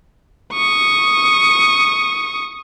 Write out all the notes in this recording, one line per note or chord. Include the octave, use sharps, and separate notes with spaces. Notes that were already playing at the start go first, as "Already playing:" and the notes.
C#6 D#6